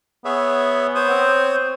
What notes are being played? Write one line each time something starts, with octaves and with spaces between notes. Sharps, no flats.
B3 G#4 C#5 E5
C5 C#5 D#6 G6
C4